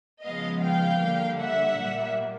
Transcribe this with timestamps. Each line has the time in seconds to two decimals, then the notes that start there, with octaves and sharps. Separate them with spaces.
0.23 C#3 F3 G#3 B3 D#5 F5
0.62 F5 G5
1.01 D3 G3 A#3
1.40 E5 F#5
1.78 A#2 G3 A#3